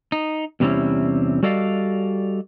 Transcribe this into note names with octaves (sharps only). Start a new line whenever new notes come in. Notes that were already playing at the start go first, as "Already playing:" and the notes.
D#4
E2 C3 G3 C4 C#4 E4
G3 F#4 A4 D5 D#5 F5